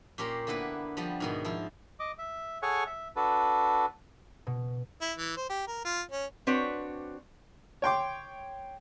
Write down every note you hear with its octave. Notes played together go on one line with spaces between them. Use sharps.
A#2 C#4 G4 A#4 C6
D3 A#3 B3 E4 B4
F3 G3 B3
G#2 B2 D#3
F3 E4 F4
D#5 D6
E5
G#4 A4 C#5 F#5 G#5 C#6
E5
D4 F#4 A4 B4
B2
E4
E3
C5
G4
A#4
F4
C#4
C4 D4 F#4 B4 C#5
C#5 G5 C6 D6